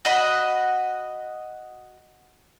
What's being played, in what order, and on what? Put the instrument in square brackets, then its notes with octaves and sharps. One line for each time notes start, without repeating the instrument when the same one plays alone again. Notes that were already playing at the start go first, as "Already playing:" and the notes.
[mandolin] F#4 D#5 B5